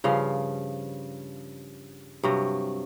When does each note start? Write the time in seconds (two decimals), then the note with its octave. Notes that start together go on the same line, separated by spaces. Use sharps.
0.04 G2 C#3 F3 F5
2.23 G2 C3 F#3